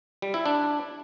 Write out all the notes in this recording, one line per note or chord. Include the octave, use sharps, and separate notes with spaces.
G3
E4
D4